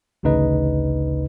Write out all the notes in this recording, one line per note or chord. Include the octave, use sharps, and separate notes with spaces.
A1 D2 C#3 D#4 B4 D#5